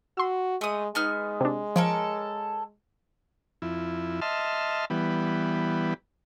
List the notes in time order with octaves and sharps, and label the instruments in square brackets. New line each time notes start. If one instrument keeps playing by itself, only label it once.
[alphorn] F#4 [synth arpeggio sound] C6 E6
[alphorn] G#3 [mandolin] A3 D#6
[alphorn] G#3 [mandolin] B3 D#4 F6
[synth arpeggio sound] C3 D4
[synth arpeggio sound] F3 [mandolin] A4 A#4 C#5
[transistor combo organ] F2 E4
D#5 E5 A5 C6 F6
E3 G3 B3